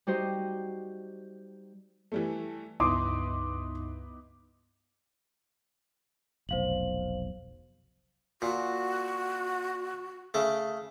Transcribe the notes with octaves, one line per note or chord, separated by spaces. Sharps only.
G3 D#4 F#4 G4 C5 D#5
E3 G3 A3
C#2 G2 B3 D#4 E4 C6 D6 D#6
F1 B1 C5 F5 F#7
A#2 F#4
C#3 A3